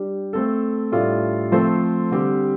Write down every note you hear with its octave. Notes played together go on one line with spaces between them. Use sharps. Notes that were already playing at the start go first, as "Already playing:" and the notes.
Already playing: G3 D4 G4
A3 C4 A4
A2 G3 D4 F4 A4
F3 A3 C4 A4 C5
D3 G3 C4 G4